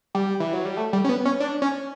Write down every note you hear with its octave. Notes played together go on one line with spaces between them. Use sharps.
G3
E3
F#3
G3
A3
G3
C#4
B3
C#4
D4
C#4